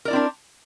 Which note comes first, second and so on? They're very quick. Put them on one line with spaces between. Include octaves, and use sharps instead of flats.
A#4 D5 E4 C4 D4